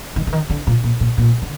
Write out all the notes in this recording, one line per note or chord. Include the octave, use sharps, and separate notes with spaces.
D#3
D3
D#3
D3
A#2
A#2
A#2
A#2
D3